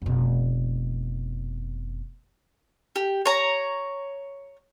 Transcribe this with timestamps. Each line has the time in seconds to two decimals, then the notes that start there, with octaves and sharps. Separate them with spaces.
0.02 F1 B2
2.96 G4
3.26 C#5 A#5